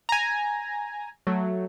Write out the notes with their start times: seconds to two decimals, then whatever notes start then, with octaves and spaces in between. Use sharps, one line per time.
0.09 G#5 A#5
1.27 F#3 A3